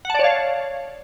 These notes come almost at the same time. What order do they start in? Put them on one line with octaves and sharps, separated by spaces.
F#5 A5 D5 C#5 F5